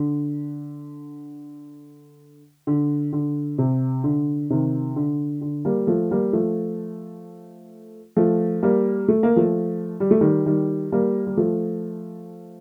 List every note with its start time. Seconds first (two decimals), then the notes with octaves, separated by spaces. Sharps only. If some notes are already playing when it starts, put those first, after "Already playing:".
Already playing: D3
2.67 D3
3.13 D3
3.58 C3
4.04 D3
4.50 C3 D#3
4.96 D3
5.41 D3
5.65 G3 A#3
5.87 F3 A3
6.11 G3 A#3
6.33 F3 A3
8.16 F3 A3
8.63 G3 A#3
9.08 A3
9.23 A#3
9.36 F3 A3
10.00 G3
10.11 A3
10.21 D#3 G3
10.46 D#3 G3
10.92 G3 A#3
11.27 G3
11.37 F3 A3